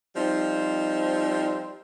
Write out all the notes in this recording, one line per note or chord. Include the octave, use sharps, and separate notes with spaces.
F3 G3 C4 D#4